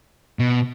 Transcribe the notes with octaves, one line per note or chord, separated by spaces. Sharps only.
B2